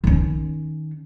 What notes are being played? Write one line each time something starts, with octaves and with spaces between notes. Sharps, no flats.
D#3 C#4